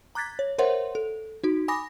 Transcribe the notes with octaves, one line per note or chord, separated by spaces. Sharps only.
A#5 D6 F#6 G#6 A6 B6
C#5
A#4 C5 C#5 E5 F#5 C6
A4
D#4 F#4
G#5 B5 D6 D#6 A#6